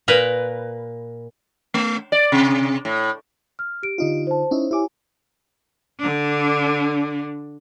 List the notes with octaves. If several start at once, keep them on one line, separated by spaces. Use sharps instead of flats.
A#2 A#4 B4
A3
D5
C3
A2
F6
G4 D7
D3 D#4 F4
C5 A5
C#4 D#4 E4 C5
E4 G4 C#5 G#5 D6
D3 D4